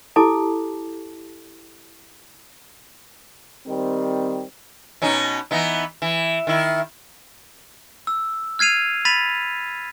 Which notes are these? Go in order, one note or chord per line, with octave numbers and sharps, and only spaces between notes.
E4 G4 A4 A5 D6
D#3 G3 C4
B2 C#4 D#4
E3 B3 D#4
E3
D#3 E4
E6
F6 G#6 C7 D#7 F7
B5 A6 B6 D#7 F7